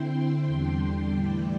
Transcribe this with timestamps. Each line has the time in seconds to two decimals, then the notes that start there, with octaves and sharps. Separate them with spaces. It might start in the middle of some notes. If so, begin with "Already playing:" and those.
Already playing: D3 C4 E4 G5 C6
0.47 E2 D3 G3 D4
1.14 A2 E3 G3 E4 D5 G5